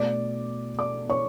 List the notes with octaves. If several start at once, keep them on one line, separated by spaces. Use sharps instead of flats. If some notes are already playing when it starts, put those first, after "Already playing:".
Already playing: B2 A3 D5 D6
D5 D6
C#5 C#6